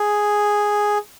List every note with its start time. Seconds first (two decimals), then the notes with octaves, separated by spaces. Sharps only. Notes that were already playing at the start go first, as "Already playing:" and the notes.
Already playing: G#4